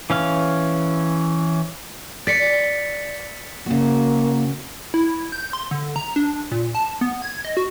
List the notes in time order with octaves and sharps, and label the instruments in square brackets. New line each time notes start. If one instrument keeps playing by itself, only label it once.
[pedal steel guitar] E3 C#4 F5 F6
[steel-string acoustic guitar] D5 [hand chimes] A6 B6 C#7
[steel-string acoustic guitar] C#3 F#4 [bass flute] A#3
[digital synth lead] E4
G6
C6
D3
A#5
D4
A#2
A5
B3
G#6
D#5
F#4